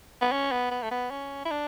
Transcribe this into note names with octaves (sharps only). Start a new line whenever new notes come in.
B3
C#4
B3
B3
A3
B3
C#4
E4
D4